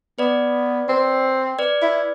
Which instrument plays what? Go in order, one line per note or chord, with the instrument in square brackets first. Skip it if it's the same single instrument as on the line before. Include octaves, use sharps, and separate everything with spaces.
[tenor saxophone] B3 [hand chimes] B4 D5
[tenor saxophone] C4
[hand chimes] B4 D5
[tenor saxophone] E4